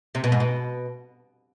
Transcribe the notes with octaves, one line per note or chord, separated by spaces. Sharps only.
C3
B2
G#2
B2